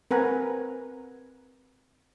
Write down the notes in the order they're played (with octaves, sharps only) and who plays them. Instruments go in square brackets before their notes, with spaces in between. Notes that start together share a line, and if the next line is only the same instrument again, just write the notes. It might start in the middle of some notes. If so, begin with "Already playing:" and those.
[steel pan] C4 A#4 B4 F#5 G#5 A#5